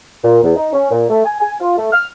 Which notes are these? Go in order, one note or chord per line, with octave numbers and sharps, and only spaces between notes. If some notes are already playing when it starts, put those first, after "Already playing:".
A#2
E2
D#4
C#4
A#2
A3
G#5
G#5
F4
A3
F6